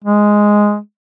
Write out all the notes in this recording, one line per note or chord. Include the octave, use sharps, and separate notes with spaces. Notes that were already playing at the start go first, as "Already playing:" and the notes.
G#3